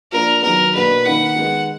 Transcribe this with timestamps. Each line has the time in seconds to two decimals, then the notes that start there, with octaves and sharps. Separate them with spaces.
0.12 F3 A#3 D4 A#4
0.43 D#3 F#3 B3 A#4
0.74 B2 A#3 D4 B4
1.05 D#3 A#3 D#4 F#5
1.36 D#3 G#3 B3